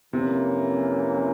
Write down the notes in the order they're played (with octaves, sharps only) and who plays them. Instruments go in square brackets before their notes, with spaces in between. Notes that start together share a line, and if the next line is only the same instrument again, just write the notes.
[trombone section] F2 E3 A#3 C#4 [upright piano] C3